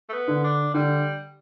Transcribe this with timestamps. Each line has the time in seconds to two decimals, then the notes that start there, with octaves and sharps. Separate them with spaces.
0.09 A3
0.13 B3
0.28 D3
0.44 D4
0.74 D3 G3